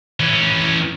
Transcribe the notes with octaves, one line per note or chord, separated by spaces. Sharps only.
E3 C#4